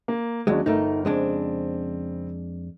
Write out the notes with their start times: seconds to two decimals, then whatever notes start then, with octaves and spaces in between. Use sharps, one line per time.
0.08 A#3
0.47 D#2 F#3 G#3 C#4 D4
0.66 G1 A3 D#4 A#4
1.05 F2 C#3 G#3 C4 D4